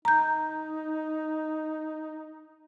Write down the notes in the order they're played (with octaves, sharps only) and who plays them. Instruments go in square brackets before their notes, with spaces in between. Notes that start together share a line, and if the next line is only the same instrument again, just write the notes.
[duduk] D#4 [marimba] A#5 G6